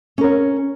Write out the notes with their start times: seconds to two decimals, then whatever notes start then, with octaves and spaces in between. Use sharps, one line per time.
0.18 C#4
0.21 A#4
0.24 C#5